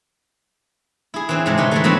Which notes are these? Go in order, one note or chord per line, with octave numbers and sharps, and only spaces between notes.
E4 G#4
E3 C4 D4
G#2 C3 G#3
G#2 D3 D#4 B4 C#5 G#5
E3 G#3 A3
F#3 B3 C4 D4